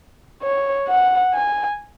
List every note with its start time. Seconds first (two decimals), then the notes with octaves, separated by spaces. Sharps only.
0.43 C#5
0.88 F#5
1.34 G#5